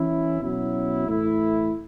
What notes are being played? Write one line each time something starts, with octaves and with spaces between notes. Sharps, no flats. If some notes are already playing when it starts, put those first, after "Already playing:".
Already playing: E3 C#4 E4
B2 F#3 C#4 E4
A2 E3 A3 E4